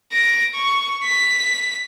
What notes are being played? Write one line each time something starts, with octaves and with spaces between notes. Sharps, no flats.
A#6 D7
C#6
B6